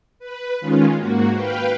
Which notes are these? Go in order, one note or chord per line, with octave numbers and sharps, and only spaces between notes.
B4
D#3 G#3 C#4 F4
G#2 A#3 F#4
B4 F5 G5